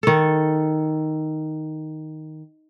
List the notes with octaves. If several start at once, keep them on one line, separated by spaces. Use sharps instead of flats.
D#3 A4